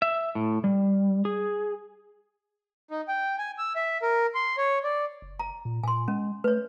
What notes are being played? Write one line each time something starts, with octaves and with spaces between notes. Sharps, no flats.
E5
A2
G3
G#4
D#4
G5
G#5
E6
E5
A#4
C6
C#5
D5
F#1
A#5
A#2
A#2 G#5 C6
G#3 C#4
A3 B4 C#5